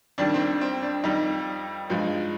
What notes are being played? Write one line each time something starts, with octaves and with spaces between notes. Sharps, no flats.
F2 D#3 G3 D4
C4
D4
C4
D4
F2 D#3 G3 D#4
G2 F3 G#3